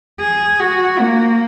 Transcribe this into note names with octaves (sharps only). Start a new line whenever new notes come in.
G#4
F#4
A#3